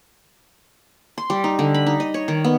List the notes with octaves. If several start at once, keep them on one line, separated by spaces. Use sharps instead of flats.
C6
G3
D#4
D3
B5
D#4
D#5
C#5
D#3
B3